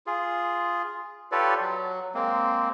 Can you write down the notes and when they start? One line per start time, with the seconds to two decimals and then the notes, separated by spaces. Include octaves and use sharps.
0.07 F4 G#4
1.32 F4 G4 A4 B4 C#5 D5
1.61 F#3
2.15 G#3 A#3 C4